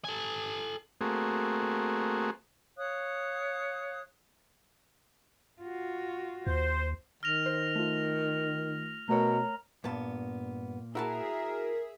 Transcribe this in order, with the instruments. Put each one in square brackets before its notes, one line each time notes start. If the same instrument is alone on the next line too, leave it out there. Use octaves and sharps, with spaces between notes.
[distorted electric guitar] A4 G#5
[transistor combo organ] A3 A#3 C4 F#4 G#4
[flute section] C#5 F5 D#6 F#6
[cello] F4 F#4
[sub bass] D#2 [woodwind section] C5
[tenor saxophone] D#3 [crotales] F6 A#6 F7
[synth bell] C5
A3 F4
[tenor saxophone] B2 [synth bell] A3 A#4 C#5 [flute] A#5
[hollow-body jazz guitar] G2 B3 A5 [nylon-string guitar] A#2
[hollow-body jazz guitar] E4 F#4 A5 [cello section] G#4 E5 [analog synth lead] A#4